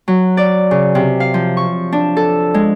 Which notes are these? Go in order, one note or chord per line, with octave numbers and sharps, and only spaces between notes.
F#3
D5
C#3
C3
F5
F3
C#6
D4
A4
G#3